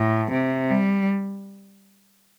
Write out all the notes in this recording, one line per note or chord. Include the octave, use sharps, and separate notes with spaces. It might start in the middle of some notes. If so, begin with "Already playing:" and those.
Already playing: A2
C3
G3